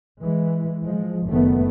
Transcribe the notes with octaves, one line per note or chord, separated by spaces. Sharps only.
E3 G#3
F3 G#3
F#1 D#3 A3 B3